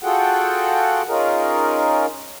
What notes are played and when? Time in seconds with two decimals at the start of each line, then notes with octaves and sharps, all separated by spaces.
0.03 F4 F#4 G#4 A4 F#5 G5
1.08 C#4 D#4 F4 G#4 A#4